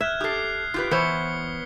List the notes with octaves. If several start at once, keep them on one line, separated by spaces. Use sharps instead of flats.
E5 F6 F#6 G#6
G4 A4 D#6 C7
F4 G4 B4
E3 B3 C5 C#5 B6 C#7 G7